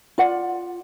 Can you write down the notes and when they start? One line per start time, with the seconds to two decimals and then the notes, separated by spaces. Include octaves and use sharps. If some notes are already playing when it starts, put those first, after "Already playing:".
0.18 F4 D5 F#5